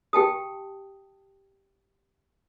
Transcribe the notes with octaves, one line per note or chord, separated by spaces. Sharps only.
G4 G5 A5 D#6